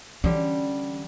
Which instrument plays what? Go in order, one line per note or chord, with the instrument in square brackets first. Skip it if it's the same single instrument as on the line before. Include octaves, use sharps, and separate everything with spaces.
[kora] D3 G3 [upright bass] E3 C#4